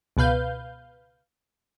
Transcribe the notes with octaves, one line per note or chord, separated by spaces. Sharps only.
C#2 B2 B4 F5 G6